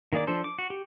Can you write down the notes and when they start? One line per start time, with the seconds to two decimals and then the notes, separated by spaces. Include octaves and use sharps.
0.13 D#3 A#3 G#4 D5 D6
0.27 F3 D4 A4 C5
0.44 D6
0.59 F#4
0.70 G4